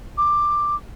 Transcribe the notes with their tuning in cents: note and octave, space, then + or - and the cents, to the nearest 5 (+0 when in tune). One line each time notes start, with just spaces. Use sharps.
D6 +10